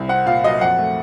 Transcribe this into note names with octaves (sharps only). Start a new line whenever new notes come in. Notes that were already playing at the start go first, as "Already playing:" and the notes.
Already playing: C2
C4 F#5
A#2 F5
F#3 D#5
F2 F#5
A3